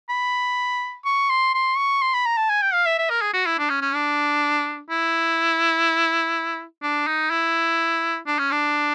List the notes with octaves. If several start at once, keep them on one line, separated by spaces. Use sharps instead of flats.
B5
C#6
C6
C6
C#6
C6
B5
A#5
A5
G#5
G5
F5
E5
E5
A#4
G#4
F#4
E4
D4
C#4
C#4
D4
E4
D4
D#4
E4
D4
C#4
D4